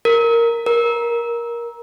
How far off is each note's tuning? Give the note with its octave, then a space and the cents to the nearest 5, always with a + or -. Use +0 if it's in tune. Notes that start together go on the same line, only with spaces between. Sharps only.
A#4 -5
A#4 +15